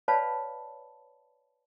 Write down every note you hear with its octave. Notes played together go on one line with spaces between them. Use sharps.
B4 C#5 D5 F5 A5 B5